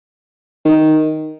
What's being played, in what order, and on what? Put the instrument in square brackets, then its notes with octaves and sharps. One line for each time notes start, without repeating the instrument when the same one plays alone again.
[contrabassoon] D#3